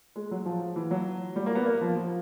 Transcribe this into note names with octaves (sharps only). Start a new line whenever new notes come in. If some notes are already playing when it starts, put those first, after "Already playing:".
G#3
F#3
F3
E3
F#3
G3
A#3
B3
A#3
F3
F3